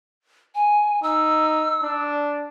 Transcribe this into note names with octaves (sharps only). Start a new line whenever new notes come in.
G#5
D#4 E6
D4